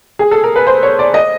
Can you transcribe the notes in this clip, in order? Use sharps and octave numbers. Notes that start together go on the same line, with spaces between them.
G#4
A4
A#4
B4
C5
C#5
D5
D#5